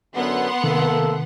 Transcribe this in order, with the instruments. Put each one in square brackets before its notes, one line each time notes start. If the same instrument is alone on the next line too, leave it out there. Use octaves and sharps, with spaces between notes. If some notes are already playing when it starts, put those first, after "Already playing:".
[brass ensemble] F#2 D3 [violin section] B3 F#5 C6
[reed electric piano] C3 D#3 [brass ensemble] A3 A#3 A4